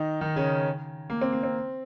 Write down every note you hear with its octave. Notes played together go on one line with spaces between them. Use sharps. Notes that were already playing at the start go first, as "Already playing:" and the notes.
Already playing: D#3 D#4
D#3 D#4
C#3 C#4
A#3
C4
A#3
C4